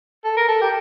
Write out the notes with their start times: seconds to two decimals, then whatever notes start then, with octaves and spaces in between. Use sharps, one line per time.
0.24 A4
0.37 A#4
0.48 A4
0.61 G4